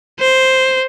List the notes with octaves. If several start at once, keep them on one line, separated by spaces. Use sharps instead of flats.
C5